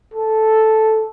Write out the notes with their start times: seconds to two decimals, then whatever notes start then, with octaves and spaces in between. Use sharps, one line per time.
0.14 A4